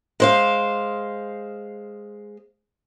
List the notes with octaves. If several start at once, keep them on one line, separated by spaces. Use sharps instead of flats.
G#3 C5 F5